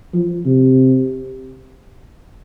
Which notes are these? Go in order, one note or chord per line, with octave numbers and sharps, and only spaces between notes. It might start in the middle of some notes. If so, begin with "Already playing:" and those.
F3
C3